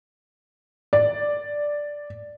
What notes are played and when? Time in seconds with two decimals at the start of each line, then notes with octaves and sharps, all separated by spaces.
0.93 D5